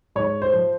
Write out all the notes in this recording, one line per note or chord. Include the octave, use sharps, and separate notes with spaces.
G#2 C#5
C5
F3